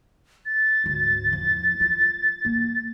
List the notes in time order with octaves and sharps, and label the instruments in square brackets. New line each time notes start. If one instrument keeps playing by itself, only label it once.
[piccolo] A6
[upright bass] D2 G#2
E2 F3
F4
A#3